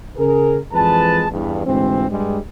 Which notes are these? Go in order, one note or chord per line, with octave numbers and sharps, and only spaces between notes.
C#3 G#4 A#4
F2 E3 G#3 B4 A5
E2 G2
D2 G#2 E3 C4
G2 G3 G#3